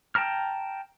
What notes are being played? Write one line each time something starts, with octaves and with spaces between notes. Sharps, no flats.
G5 A5 A#5 F6